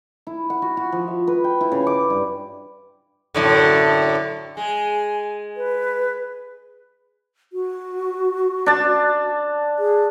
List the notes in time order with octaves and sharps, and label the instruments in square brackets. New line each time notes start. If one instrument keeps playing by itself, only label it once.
[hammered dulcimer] E4
F#5
F#4
F#4
F3
E5
B4
G5
E4
C#3
D6
G2
[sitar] F#2 A2 D3
[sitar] G#3 [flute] G#5
[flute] B4
[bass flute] F#4
[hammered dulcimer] D4 A5
[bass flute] G#4